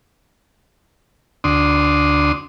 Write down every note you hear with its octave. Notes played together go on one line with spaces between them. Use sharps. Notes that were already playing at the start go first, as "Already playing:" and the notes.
D2 D4 C6 D#6